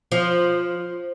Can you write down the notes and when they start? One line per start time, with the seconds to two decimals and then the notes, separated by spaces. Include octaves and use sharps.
0.12 F3